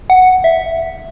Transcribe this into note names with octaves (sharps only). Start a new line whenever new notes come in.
F#5
E5